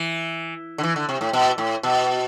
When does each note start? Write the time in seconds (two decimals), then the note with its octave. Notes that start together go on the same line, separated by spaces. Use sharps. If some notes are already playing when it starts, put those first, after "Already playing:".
Already playing: E3
0.78 D3
0.83 E3
0.96 D3
1.09 C3
1.21 A2
1.33 B2
1.58 A2
1.83 B2